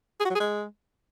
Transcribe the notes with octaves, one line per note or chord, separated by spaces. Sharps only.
G#4
F#4
F#3
G#4
G#3